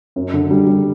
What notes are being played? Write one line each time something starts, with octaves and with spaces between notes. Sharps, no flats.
F#2
D3
G3
G3